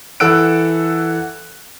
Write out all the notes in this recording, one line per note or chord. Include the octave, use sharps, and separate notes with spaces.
E3 A4 F#5 E6 F#6 D7